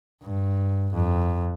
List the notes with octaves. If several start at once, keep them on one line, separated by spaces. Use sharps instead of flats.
G2
F2